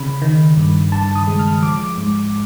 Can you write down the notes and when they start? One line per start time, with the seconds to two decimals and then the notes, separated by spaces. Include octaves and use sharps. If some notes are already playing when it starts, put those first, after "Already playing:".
Already playing: C#3 B5
0.22 D#3
0.57 G2
0.92 G2 A5
1.15 D#6
1.27 G#3
1.39 F6
1.62 F3 D6
1.98 G#2